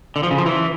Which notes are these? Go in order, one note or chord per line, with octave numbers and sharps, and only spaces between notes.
D3
F3
C#3
F3
E3